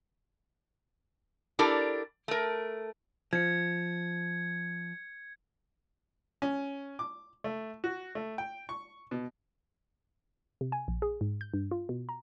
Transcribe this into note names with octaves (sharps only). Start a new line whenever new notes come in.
D4 E4 G4 A4 A#4 D5
A3 A#4
F3 G#6 C#7
C#4
D6
A3
F#4
A3
G5
C#6
B2
C3
G#5
A#1
G#4
G#2
G6
G2
F4
B2
A#5